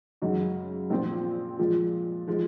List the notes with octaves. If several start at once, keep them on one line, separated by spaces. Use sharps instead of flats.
F#2 C#3 G#3 D#4 F#4
A#1 A#2 F3 C4
A#2 F3 G#3
F3 G#3